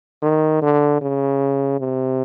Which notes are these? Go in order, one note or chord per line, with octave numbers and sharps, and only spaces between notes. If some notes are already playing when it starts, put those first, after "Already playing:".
D#3
D3
C#3
C3